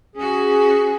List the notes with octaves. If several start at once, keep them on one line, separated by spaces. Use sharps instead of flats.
C#4 F#4 G#4